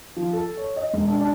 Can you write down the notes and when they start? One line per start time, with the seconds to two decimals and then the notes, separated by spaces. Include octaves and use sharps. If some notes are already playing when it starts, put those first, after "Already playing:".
0.16 F3
0.33 A4
0.57 C#5
0.76 D#5
0.93 E1
1.07 D4
1.20 D4